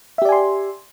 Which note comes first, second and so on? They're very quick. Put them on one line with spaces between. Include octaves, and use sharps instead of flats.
E5 G4 D5 G#5 C6